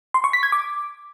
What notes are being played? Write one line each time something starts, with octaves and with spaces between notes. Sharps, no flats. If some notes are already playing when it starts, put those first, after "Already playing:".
C6
C#6
B6
G#6
D6